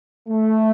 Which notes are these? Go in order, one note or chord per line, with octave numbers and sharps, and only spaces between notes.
A3